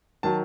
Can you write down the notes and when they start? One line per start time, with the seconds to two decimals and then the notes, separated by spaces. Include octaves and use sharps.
0.23 D#3 F#3 A5